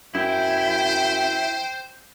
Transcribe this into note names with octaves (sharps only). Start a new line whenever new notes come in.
F#2 E4 C5 G5